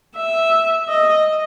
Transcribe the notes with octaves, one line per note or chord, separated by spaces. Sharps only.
E5
D#5